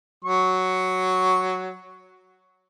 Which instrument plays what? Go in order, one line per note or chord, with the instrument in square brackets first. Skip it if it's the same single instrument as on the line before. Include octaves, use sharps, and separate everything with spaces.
[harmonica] F#3 C#6